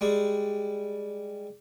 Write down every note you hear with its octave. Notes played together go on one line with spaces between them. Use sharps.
G3 G#3